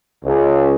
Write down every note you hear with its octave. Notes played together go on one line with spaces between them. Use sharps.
C#2